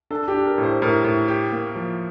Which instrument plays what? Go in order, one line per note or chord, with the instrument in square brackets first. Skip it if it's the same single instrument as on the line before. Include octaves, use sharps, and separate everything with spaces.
[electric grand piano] D4 [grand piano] A4
[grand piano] G4
[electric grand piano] D4
[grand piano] A#4
[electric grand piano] A2
[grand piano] C5
[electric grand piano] A2 [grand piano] A#4
[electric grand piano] A2
G4
A#3
F3